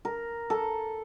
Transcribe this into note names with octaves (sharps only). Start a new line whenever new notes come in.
A#4
A4